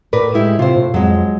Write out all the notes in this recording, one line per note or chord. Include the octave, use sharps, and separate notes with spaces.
A2 A#4 B4 D5
G#3 E4 G4
C3 F4 C5
A2
F2 F#3 G#3